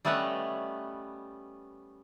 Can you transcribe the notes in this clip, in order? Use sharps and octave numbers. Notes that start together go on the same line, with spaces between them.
G3 A3 B3 C#4 B4 D#5